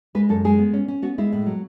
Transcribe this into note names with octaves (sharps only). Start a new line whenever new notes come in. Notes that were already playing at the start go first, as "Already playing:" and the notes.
G#3 B4
F#2 A4
G#3 G#4
B3
C#4
C#4
B3 F#4
G#3 E4
A2
F#3